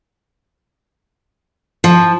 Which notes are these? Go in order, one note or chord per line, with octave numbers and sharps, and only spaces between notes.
F3